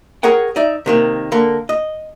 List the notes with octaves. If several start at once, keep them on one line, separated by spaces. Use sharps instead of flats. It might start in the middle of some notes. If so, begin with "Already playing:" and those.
G#4 A#4 C#5 F#5 G5
D#4 D5 E5
C3 D#3 A#3
D3 A#3
D#5